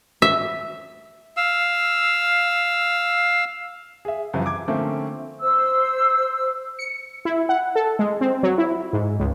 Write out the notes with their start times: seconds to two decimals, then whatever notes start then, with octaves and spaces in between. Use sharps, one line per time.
0.22 E5
1.37 F5 E6
4.05 G#4 E5
4.34 F#2 C#3 E3 F3 G3
4.46 D6 G#6
4.68 D3 F3 A3 A#3 C4 C#4
5.41 C5 E6
6.79 C#7
7.25 E4
7.49 F#5
7.76 A4
7.99 G#3
8.21 C4
8.43 F#3
8.58 E4
8.93 G#2
9.19 C#2